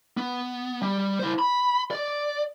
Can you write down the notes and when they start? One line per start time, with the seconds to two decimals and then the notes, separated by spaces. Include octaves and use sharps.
0.17 B3
0.82 G3
1.19 E4 C5
1.39 B5
1.91 D5